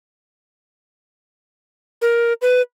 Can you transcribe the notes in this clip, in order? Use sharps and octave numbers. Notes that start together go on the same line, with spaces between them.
A#4
B4